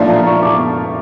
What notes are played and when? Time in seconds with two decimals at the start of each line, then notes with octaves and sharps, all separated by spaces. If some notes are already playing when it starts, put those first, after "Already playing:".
Already playing: A#2 F3 A3 D4 F4 D5
0.10 A#5
0.26 C#6
0.42 D6